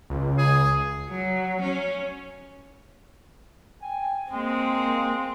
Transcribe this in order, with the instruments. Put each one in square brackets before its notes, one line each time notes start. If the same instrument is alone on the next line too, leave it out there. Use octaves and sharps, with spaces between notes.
[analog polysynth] C#2
[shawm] G#4
[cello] F#3
C#4
[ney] G5 [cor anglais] G#5
[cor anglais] G#3 [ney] A#3 [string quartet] C4